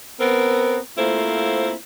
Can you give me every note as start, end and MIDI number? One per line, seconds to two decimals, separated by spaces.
0.20 0.78 59
0.20 0.78 60
0.20 0.78 70
0.98 1.73 57
0.98 1.73 58
0.98 1.73 60
0.98 1.73 64
0.98 1.73 65
0.98 1.73 72